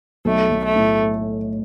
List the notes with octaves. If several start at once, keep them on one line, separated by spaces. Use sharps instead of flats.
B1 A3
B1
A3
A2
A3